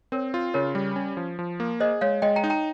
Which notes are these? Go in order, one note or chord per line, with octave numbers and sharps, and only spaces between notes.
C4 A#4 C#5
F4
C#3 A#4 C#5
G3
C#4
F3
F3
A#3
G#4 C5 D#5
G#3 C#5 F5
G#3 D#5 G5
G5 A#5
D#4
G5 A#5